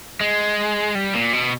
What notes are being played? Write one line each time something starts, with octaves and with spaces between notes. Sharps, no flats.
G#3
G3
A#2
B2